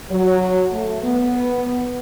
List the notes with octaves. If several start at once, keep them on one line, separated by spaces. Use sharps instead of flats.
F#3
A3
B3